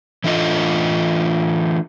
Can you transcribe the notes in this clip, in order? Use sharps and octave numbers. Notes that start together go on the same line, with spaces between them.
E3 A3 D4 F4 A4 D#5